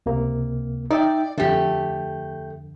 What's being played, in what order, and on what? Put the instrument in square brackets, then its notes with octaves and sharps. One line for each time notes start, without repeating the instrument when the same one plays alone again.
[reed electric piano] C#2 C3 A#3
[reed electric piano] D#4 E5 G5 [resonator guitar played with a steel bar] D5
[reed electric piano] F2 D3 [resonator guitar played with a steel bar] A3 G4